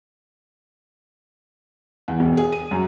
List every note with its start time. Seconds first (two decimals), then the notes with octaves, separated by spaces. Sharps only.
2.08 E2
2.20 E1
2.37 G#4
2.52 D#7
2.71 F#2